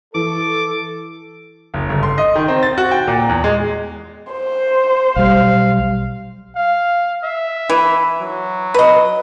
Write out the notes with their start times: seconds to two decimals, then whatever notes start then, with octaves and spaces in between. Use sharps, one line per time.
0.14 E3 A4 D6
1.74 F#1
1.90 G1
2.03 C6
2.18 D#5
2.35 D#3
2.48 C4
2.63 A6
2.78 F#4
2.91 G5
3.08 A#2
3.29 E2
3.44 G#3
4.31 C5
5.16 B1 G3 F5
6.56 F5
7.24 E5
7.70 E3
8.20 F#3
8.74 B4 D#5